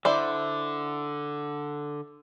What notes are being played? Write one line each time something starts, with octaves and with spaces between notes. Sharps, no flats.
D3 E4 C5 D5